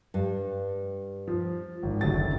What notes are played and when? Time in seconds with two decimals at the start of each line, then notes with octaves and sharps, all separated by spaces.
0.14 G2
1.28 F3
1.83 G#1
2.01 F#1 D2 F#3 A6